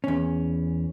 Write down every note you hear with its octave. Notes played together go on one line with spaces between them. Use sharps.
E2 C#4